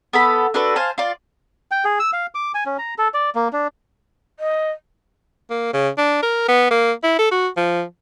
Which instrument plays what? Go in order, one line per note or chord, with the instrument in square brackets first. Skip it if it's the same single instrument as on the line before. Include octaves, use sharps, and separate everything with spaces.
[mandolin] B3 A4 B5
D4 F#4 A4 B4
C5 F5 G#5 A5
F4 D5
[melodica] G5
G#4
E6
F5
D6
G#5
C#4
A#5
A4
D5
A#3
D4
[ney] D#5
[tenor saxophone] A#3
C#3
D4
A#4
B3
A#3
E4
A4
F#4
F3